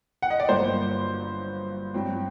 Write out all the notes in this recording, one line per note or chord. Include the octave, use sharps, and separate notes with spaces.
F#5
D#5
D5
G1 G2 F#3 A#3 C5
G2 F#3 C4